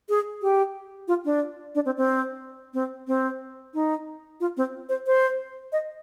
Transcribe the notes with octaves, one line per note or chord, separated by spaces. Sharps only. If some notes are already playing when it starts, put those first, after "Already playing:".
G#4
G4
F4
D4
D4
C4
C4
C4
C4
D#4
F4
C4
C5
C5
D#5